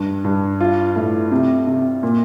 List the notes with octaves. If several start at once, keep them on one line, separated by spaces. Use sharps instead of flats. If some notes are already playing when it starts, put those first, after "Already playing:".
Already playing: G2
G2
F4
A2
C3
C3
A#2